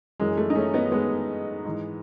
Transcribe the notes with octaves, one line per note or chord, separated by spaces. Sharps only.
F#2 E3 G#3
A3
D#4
A3 C#4
B3 D#4
G#3 B3
G#2 E3